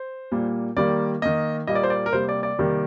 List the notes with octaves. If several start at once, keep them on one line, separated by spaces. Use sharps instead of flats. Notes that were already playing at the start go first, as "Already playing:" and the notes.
Already playing: C5
A#2 G3 A#3
D#3 G3 A#3 D5
D#3 A#3 D#5
A#2 G3 A#3 D#5
D5
C5
D5
A#4
C3 G3 A#3 C5
D5
D5
C3 D#3 G3 A#3